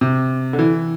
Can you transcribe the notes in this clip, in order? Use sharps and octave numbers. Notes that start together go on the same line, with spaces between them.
C3
D3
E3